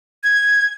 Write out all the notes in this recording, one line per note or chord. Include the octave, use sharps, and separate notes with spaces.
G#6